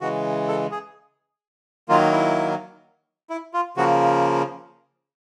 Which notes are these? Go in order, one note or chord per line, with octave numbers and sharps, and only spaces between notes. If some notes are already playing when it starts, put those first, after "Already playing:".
C#3 E3 G#3 F#4
A4
G#4
D#3 F#3 A#3 F4
E4
E4
F4
C#3 F3 A#3 F#4